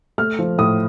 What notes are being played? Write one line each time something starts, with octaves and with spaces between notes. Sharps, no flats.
A3 F6
F3
A2 D#6